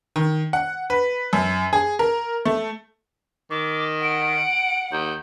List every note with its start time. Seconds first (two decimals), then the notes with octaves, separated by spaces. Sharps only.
0.16 D#3
0.53 F#5
0.90 B4
1.33 F#2
1.73 G#4
1.99 A#4
2.45 A3
3.50 D#3 D6
4.03 F#5 D7
4.92 D#2 G6